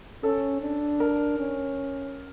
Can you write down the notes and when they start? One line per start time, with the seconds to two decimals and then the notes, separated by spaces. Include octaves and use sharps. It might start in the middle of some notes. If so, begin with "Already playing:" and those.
0.23 C#4 A4
0.62 D4
1.00 A#4
1.39 C#4